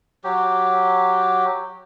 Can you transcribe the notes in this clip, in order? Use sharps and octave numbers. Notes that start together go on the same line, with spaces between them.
F#3 G4